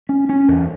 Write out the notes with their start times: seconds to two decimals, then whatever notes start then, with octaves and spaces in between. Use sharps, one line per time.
0.09 C#4
0.29 C#4
0.48 E2